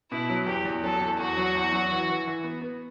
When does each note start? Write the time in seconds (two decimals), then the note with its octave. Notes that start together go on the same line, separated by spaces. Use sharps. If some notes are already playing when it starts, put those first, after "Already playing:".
0.11 B2 E4
0.30 F#3
0.47 E2 G4
0.65 E2
0.83 F#3 A4
1.01 E2
1.19 E2 F#4
1.37 F#3
1.55 E2
1.72 F#3
1.91 E3
2.09 E3
2.27 E3
2.44 B3
2.62 B3